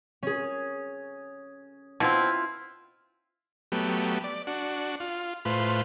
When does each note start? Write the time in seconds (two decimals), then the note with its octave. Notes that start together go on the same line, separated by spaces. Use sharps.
0.23 C#4 G#4
2.00 B2 C4 E4 F4
3.72 F#3 A3 B3 G4
4.24 D5
4.47 D4 F#4
5.00 F4
5.45 A2 F4 B4 C5